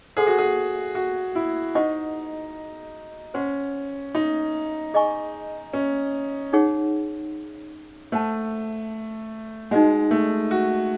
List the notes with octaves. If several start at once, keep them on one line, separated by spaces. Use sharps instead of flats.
G#4 A4 C5 F#5 C6
F#4
G#4
F#4
E4
D#4 C5 D#5 F#5 C#6
C#4 C5 F#5 C6
D#4
G#4 D#5 G#5 C#6
C#4
D#4 G#4 C#5 F#5
A3 C5 F#5 A5
G#3 D#4 F#4 C5 D#5 F#5
A3
F#4